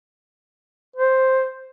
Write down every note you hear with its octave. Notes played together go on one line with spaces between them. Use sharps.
C5